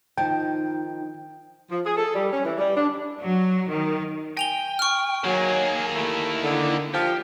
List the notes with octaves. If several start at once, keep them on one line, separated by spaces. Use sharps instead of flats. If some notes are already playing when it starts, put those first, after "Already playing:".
D#3 F3 D#4 G5 A5
F3
G#4
A4
G3
C#4
E3
G3
D4
F#3
D#3
G5 G#5 F7 G7
C#6 F6
D#3 F#3 A#3 G#4
D#2 A3 E4
D3
F3 G4